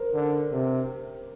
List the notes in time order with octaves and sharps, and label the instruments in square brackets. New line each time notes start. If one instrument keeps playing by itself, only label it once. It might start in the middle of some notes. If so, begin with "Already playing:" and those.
Already playing: [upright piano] A#4 C5
[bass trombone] D3
C3